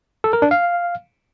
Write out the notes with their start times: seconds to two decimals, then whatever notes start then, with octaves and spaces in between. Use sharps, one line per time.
0.24 A4
0.33 A#4
0.42 D4
0.51 F5